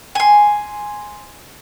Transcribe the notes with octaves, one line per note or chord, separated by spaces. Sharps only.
G#5 C6